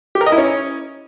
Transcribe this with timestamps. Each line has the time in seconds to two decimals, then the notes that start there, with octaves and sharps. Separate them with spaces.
0.15 G4
0.21 A#4
0.26 D#5
0.32 E4
0.38 C#4